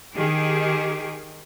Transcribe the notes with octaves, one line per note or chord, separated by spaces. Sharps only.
D#3 G4 G#4